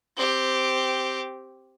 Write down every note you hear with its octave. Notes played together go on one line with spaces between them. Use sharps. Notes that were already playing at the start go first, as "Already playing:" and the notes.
C4 G4